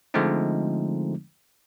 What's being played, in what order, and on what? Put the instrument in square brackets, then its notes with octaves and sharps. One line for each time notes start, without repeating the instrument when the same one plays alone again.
[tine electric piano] D3 F3 G#3 A3 C4 D#4